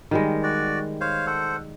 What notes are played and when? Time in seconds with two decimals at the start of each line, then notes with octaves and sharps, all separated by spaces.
0.11 D#3 G3 G#3
0.43 F#4 D5
1.01 C5 C#5 F5
1.27 A4 C5 F#5